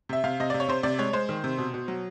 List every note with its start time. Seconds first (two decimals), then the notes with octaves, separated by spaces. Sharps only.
0.09 C3 E5
0.24 C3 F5
0.40 C3 D#5
0.50 C3 D5
0.60 C#5
0.68 C3 C5
0.83 C3 D5
0.99 G#3 C#5
1.13 G#3 C5
1.29 D#3
1.44 C3
1.58 B2
1.74 B2
1.88 F#3